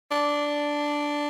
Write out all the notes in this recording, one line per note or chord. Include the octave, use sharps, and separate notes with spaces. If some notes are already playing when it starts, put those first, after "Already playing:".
D4